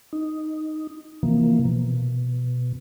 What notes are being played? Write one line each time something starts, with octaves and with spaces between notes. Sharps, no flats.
D#4
C3 E3 F3 A#3
B2